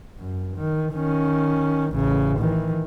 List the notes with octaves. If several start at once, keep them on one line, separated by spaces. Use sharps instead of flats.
F#2
D#3
D#3 C#4
A1 C#3
D#3 E3